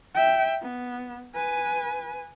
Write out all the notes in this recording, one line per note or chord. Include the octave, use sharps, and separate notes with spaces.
E5 G5
B3
B4 G#5